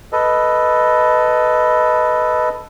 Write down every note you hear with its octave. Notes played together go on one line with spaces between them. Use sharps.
A4 B4 D#5